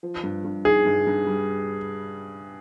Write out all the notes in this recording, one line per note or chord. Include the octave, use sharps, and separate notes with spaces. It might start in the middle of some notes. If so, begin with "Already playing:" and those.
F3
G2
G2
D#4 G#4
G2
G2
G3